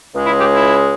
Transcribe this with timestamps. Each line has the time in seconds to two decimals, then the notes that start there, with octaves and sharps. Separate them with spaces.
0.13 C#2 C#3 G#3
0.26 E4
0.40 G4
0.54 E4